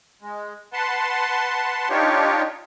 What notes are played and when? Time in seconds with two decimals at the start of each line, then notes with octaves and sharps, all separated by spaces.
0.22 G#3
0.73 B4 F#5 A5 C6
1.90 D4 D#4 F4 G4 C#5